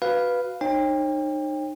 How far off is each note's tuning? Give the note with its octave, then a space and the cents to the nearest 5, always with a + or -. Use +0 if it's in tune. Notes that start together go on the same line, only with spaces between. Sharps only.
F#4 +5 B4 +0 F5 +0
D#4 -35 C#5 -45 G5 +30